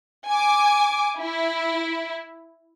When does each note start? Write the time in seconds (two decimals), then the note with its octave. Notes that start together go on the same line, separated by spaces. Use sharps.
0.27 G#5 D6
1.19 E4